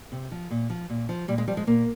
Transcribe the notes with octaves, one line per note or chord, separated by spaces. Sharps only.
C3
F3
A#2
F3
A#2
F3
A#2 G3
G#3
F3 G3
G#3
A#2 A#3